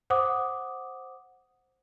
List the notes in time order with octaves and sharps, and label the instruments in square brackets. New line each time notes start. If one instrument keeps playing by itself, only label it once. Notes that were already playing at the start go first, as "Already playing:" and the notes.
[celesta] C5 F#5 D6 D#6